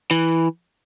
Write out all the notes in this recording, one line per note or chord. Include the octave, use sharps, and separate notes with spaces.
E3